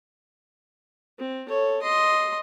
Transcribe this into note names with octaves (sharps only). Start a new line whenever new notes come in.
C4
A4 C#5
D#5 C6